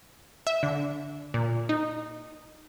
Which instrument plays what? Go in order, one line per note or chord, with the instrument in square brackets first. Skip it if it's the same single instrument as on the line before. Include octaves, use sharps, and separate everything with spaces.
[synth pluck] E5
D3
A#2
D#4